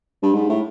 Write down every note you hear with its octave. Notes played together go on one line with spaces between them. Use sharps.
G2
G#2
A2